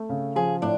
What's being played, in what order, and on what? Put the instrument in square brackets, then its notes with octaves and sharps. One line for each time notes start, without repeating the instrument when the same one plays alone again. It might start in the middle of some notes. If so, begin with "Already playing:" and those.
Already playing: [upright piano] A3
C#3
[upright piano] F3 [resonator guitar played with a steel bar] G#4
[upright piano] A2 [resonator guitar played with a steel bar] D4